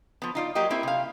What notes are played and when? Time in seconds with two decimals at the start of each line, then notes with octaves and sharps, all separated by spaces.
0.22 F3 B3
0.35 D#4 F4 D5
0.55 F#3 A#3 G4 D5 D#5
0.70 A#3 C4 E4
0.83 C3 F5